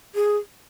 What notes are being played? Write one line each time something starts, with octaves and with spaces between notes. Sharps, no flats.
G#4